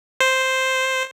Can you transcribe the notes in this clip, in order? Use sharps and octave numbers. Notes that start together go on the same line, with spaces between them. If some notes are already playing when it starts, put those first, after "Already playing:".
C5